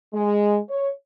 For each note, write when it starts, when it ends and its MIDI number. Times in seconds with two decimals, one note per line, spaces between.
0.14 0.58 56
0.70 0.90 73